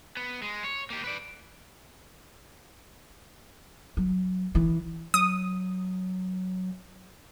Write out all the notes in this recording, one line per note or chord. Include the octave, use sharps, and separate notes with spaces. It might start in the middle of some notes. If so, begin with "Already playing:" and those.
B3
G#3
C#5
A#3 G4
B4 D5
F#3
E3
F#3 D#6